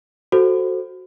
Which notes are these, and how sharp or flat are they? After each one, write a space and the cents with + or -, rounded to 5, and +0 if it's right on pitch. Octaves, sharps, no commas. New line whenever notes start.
F#4 +0 A4 +0 C5 +0